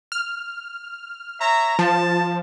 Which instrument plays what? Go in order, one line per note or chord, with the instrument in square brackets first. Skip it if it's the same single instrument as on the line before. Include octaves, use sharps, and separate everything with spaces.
[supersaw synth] F6
[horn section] C#5 E5 A#5
[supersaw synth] F3 [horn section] A5